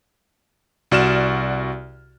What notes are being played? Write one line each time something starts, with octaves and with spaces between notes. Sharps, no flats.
C2 F#4 D5 F6 E7